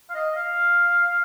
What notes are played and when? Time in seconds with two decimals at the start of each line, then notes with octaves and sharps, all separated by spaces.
0.10 F5
0.14 D#5
0.35 F5